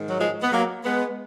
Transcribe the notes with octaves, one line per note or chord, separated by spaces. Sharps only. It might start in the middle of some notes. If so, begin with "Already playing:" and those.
Already playing: G#2 D#3
F#3
F3 G#3
B3
F#3 A#3
G#3 B3